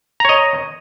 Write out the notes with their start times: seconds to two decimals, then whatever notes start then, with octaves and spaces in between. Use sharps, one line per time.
0.20 A#5
0.25 C#5
0.29 D#5